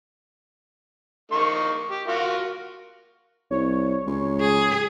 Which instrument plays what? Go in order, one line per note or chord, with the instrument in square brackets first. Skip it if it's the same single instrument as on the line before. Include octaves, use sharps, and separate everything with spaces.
[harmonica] A#3 D#4 C#6
G4
F4 F#4 A#4
[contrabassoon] C2 [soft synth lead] C#5
[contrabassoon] C#2
[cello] G#4